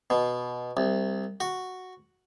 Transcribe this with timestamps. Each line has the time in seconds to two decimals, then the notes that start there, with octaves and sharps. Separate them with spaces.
0.10 B2
0.77 C2
1.40 F#4